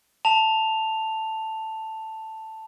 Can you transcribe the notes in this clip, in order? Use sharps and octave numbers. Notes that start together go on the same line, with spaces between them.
A5 F7